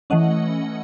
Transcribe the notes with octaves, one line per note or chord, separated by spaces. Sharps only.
E3 A3 C#4 D#5 F#5